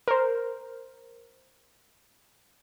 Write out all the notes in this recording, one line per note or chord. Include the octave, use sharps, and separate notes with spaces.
A#4 C5